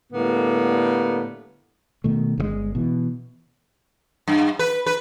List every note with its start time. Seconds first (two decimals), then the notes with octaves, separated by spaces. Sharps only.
0.12 A2 D3 G3 A#3 B3
2.04 B2 D#3 A3
2.38 G1 C#3 G#3
2.75 B2 E3
4.28 G2
4.59 B4
4.86 B4